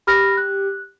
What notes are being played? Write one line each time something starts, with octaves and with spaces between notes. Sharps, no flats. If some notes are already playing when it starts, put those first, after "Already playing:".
G4 B5 F6 A#6
F#6